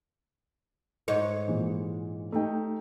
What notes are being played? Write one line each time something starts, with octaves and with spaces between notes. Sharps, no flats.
G#2 C#5
A#2 E3 G#3
A3 D#4 G5